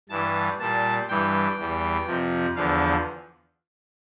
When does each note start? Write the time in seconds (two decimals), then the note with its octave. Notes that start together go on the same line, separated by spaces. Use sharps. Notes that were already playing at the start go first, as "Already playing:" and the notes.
0.09 G2 E3 G3 A5
0.59 A#2 G3 A5
1.08 G2 E3 G3 G5
1.58 E2 E3 G3
2.07 F2 C3 F3
2.56 E2 D3 F3 F5